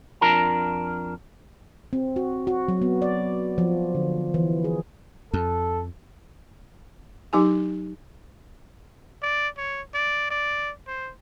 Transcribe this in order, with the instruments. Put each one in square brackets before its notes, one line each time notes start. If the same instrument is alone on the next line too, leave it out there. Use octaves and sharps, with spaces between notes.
[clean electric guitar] F2 D4 F4 A#4 A5 A#5
[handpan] C4
F#4
F#4
F#3
B3
D5
F3
D3
E3
G#4
[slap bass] F2 [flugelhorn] A4
[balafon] F#3 D#4 G4 G#5
[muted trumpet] D5
C#5
D5
D5
C5